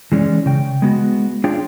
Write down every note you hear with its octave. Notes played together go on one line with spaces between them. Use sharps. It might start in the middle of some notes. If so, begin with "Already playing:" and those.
E3 G#3 C#4 D5
C#3 G5
G#3 B3 F#4
D4 F4 G#4 C#5 F5 G5